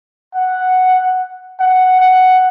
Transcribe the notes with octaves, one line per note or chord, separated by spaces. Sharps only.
F#5
F#5
F#5